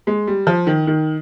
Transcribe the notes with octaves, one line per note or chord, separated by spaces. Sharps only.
G#3
G3
F3
D#3
D#3